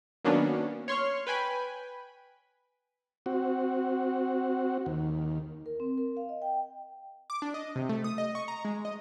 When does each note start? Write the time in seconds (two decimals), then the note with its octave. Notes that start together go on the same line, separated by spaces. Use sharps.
0.24 D#3 F#3 A#3 B3 C#4 D4
0.88 C#5 C6 C#6 F6
1.27 B4 G5 G#5 B5
3.26 C4 F#4
4.86 D#2
5.66 A#4
5.80 C4
5.98 A#4
6.17 F5
6.29 D#5
6.42 G5
7.30 D6
7.42 D4
7.54 D#5
7.76 C3
7.89 A3
8.04 D#6
8.18 D#5
8.35 C#6
8.48 A#5
8.65 G#3
8.85 D#5